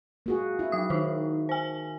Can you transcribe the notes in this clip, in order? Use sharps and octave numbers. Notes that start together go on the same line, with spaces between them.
A#3 F#4 G#4
E4
F#3 D#6
D#3 D#4 E4
C5 G#5